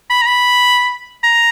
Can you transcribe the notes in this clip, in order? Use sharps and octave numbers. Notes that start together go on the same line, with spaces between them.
B5
A#5
B5
A#5